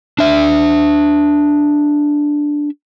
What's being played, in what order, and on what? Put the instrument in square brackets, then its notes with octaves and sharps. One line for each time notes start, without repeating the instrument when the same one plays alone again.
[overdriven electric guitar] D4 E5